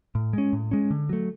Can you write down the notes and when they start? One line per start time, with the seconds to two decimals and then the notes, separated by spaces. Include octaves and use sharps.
0.15 A2
0.33 G#3 C#4
0.53 A2
0.71 G#3 C#4
0.91 D3
1.09 F#3 A3